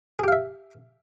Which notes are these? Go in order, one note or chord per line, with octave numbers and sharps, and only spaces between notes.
G4 G#4 E5 F5